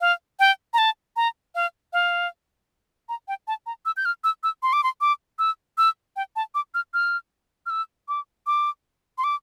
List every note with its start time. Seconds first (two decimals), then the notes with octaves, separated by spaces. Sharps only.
0.01 F5
0.39 G5
0.74 A#5
0.78 A5
1.16 A#5
1.55 F5
1.93 F5
3.09 A#5
3.28 G5
3.47 A5
3.66 A#5
3.86 E6
3.97 G6
4.05 F6
4.24 E6
4.43 E6
4.63 C6
4.73 D6
4.84 C6
5.01 D6
5.39 E6
5.78 E6
6.16 G5
6.36 A5
6.55 D6
6.74 F6
6.94 F6
7.66 F6
7.70 E6
8.08 D6
8.47 D6
9.18 C6
9.24 D6